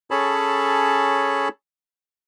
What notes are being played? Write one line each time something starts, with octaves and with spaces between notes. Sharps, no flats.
C#4 G#4 A4 C#5 A5 B5